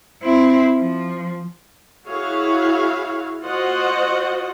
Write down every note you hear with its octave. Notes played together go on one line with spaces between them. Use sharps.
C4 E4
F3
E4 F#4 G#4 C#5 F5
F4 F#4 C5 D#5 F#5